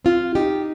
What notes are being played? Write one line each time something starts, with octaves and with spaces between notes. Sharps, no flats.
C4 F4
D#4 G4